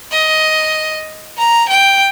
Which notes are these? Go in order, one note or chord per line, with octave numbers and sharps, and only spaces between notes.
D#5
A#5
G5